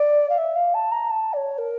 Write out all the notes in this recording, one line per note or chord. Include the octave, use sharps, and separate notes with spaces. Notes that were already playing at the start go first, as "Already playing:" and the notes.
Already playing: D5
F5
E5
F5
A5
A#5
A5
D5
C#5
A#4